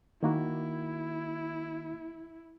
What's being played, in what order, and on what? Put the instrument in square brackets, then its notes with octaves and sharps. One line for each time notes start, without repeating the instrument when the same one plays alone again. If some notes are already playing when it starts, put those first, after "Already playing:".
[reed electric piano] D#3 A#3 F#4 [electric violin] E4